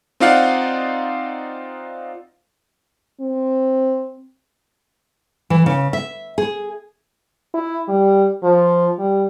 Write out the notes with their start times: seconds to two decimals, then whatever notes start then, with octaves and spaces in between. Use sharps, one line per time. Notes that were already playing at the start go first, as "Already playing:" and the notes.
0.20 C4 D#4 F4 D5 F5 F#5
3.21 C4
5.50 E3
5.66 C#3
5.93 E5
6.38 G#4
7.54 E4
7.88 G3
8.43 F3
8.99 G3